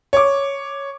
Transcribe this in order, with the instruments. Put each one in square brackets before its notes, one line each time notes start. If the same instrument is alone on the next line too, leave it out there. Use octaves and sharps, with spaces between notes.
[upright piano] C#5 D6